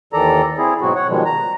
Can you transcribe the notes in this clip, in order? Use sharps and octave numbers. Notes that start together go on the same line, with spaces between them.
D#2 D#3 E3 A4 D5 A#5
C4 E4 G#4
G#2 B2 F#3 C4 F#4
C#5 F#5
B2 D#3 F3 G3 G#3
A#5